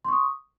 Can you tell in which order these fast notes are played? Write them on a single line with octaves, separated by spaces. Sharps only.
C6 C#6 D#6